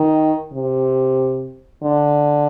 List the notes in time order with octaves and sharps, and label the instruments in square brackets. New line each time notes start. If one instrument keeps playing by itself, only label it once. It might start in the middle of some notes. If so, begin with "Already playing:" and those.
Already playing: [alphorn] D#3
C3
D3